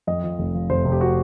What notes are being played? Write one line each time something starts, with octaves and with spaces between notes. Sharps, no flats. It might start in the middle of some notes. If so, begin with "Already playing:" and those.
F2 D#5
F3
F1
F3
F1 C5
C3
G4
F#4